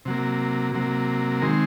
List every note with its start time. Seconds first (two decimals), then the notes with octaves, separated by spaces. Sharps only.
0.05 C3 F#3 A#3
0.74 C3 F#3 A#3
1.42 D#3 G#3 C4 A#4